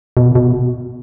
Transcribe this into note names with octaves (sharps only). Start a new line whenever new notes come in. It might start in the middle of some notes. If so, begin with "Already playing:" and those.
B2
B2